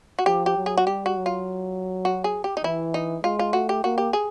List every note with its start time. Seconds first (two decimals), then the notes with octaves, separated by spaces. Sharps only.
0.19 F#4
0.26 F3 G4
0.46 G4
0.57 F#3
0.66 G#4
0.77 F#4
0.86 G3 G4
1.06 F#4
1.16 F#3
1.26 F4
2.05 F#4
2.24 G#4
2.44 G4
2.57 D#4
2.64 E3 E4
2.94 D#4
3.23 G#3 F4
3.39 F4
3.53 A3 F#4
3.69 G4
3.84 A#3 F#4
3.98 G4
4.13 G#4